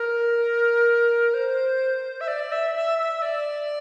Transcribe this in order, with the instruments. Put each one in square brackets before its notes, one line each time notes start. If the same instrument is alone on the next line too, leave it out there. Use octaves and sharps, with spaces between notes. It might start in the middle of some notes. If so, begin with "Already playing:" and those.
Already playing: [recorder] A#4
C5
E5
D5
E5
E5
E5
D5